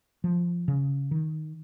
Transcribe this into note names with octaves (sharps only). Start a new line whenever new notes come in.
F3
C#3
D#3